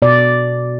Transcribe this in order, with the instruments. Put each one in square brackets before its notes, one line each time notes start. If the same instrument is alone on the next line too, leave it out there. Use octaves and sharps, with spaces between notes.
[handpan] B2 D5